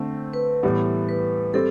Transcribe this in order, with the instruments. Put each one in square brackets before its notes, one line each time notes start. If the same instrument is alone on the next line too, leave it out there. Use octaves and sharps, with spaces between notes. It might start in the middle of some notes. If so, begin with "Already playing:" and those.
Already playing: [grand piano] D3 A3 C4
[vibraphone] B4
[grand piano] A2 E3 G3 B3
[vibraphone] B4
[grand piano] G3 C4 [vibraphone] A4